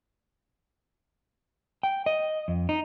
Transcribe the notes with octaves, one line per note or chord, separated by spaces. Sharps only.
G5
D#5
F2
D#4